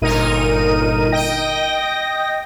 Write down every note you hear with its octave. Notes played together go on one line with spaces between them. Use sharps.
G1 A#2 D#4 A#4 D#7
D#5 G5 A#6